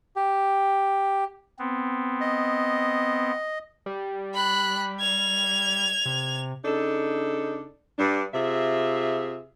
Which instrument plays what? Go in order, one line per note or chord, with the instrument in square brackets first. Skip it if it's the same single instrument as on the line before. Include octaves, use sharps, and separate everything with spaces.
[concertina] G4
[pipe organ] B3 C4
[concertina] D#5
[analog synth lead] G3
[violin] B5 F#6
G#6 F7
[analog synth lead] C3
[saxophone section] C#3 D4 D#4 A4
G2 D4
C3 F4 G#4 E5